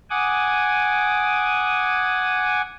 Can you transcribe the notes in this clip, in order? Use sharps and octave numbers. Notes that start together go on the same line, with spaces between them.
F#5 G#5 D6 D#6